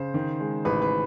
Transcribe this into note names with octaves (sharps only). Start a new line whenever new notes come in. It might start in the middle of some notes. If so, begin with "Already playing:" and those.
Already playing: C#3 C5
D#3
G#3
A1 B4
B4